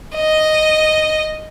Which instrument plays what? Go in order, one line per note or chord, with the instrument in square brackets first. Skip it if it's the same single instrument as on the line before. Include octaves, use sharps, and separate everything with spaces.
[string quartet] D#5